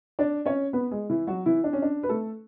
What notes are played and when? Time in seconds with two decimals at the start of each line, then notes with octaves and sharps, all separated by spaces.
0.19 D4 D5
0.46 C#4 C#5
0.73 B3 B4
0.91 G#3 G#4
1.09 E3 E4
1.27 F#3 F#4
1.46 E3 E4
1.64 D4
1.73 C#4
1.82 D4
2.03 B4
2.09 A3 A4